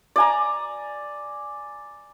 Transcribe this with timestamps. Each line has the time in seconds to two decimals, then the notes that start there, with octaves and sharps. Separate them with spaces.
0.16 D5 G#5 A#5